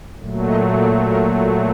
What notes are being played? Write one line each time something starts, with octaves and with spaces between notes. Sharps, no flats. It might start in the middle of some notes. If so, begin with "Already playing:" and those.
A#2 F#3 A3
D#5
D5
A#4